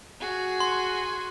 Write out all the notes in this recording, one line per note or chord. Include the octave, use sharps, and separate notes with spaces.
F#4 G#4
C6